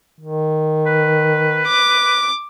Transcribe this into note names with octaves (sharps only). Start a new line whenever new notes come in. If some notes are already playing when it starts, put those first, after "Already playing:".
D#3
B4
D6